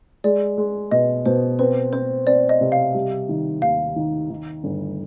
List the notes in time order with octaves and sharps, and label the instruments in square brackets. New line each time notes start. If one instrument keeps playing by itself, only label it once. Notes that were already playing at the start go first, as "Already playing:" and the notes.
[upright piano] G#3 [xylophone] D5
[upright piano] G#3
[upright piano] B2 [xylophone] D#5
[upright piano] B2 [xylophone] C5
[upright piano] C4 [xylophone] B4
[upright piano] C4 [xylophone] C5
[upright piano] C4 [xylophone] D5
[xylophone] D#5
[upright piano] C3
[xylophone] F5
[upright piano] G3
D#3
[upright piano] D#2 [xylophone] F5
[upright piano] D#3
D#3
G1